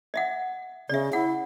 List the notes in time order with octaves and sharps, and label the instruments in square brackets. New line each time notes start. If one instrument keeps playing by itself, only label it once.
[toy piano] D#5 E5 F#5
[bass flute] C#3 [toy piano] D5 E5
[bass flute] E4 [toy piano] F#5